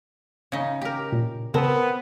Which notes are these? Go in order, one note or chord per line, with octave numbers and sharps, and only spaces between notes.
C#3 D#4
G4 A#4
A#2
C#3 B3 C4 A#4 A5